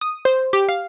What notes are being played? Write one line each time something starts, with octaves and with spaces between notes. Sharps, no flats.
D#6
C5
G4
F5